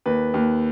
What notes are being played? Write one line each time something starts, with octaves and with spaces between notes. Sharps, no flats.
D#2 B4
D#2